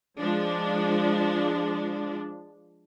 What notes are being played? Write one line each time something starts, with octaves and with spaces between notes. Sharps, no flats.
F3 G#3 D4